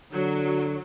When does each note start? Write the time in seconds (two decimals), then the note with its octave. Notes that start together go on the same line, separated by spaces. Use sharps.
0.13 D3 F#3